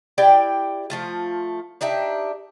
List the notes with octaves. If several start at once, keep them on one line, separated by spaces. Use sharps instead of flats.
E4 G4 D5 G5
F3 A3 F4
D4 D#4 G4 E5